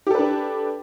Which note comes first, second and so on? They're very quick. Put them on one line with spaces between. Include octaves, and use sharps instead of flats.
G4 A4 B4 D4